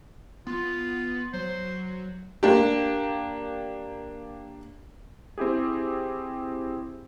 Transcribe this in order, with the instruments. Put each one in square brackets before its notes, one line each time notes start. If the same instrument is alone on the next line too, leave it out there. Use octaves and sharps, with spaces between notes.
[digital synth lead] B3 [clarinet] F4
[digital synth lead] F#3 [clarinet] C5
[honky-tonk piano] A#3 D4 G4
[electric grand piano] C4 E4 G4 G#4